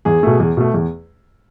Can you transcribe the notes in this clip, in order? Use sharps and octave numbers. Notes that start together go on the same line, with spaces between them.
E2 G#4
B2 A3
E2
B2 A3
E2